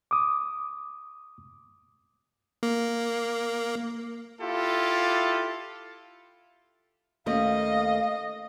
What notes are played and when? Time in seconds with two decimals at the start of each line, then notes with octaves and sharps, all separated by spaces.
0.11 D6 D#6
2.63 A#3
4.41 E4 F4 G4 A4
7.26 D#2 A3 C#4 D#5 F5